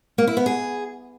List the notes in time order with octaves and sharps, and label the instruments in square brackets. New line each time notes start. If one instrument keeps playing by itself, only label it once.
[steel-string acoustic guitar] A#3
E4
B3
G#4